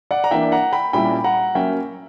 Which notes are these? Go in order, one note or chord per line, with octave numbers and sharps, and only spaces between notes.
D5 F#5
A#5
E3 A#3 D4 E5 G5
F#5 A#5
G5 B5
A#2 G3 C#4 E4 G5 B5
F#5 A#5
F#3 A#3 C#4 E5 G5